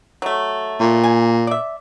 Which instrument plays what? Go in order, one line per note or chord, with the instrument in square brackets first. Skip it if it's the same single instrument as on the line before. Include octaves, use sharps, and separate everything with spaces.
[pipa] F#3 A3
[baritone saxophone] A#2
[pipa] G#5
D5 E5